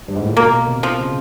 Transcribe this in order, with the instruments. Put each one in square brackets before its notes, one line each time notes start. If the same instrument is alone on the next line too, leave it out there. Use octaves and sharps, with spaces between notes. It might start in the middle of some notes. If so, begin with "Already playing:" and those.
[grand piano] G2
G#2
A2
A#2
[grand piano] B2 [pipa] A#3
[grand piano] C3
[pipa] F3
[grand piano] C#3